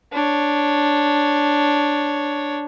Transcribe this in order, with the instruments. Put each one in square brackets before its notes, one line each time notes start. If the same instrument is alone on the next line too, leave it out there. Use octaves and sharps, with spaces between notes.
[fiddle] D4 C#5